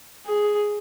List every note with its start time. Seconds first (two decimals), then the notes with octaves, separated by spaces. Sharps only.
0.27 G#4